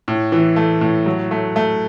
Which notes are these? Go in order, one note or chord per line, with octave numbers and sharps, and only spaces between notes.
A2
E3
A3
A2
F#3
A3
A3